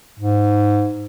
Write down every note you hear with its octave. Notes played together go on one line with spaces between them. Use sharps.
G#2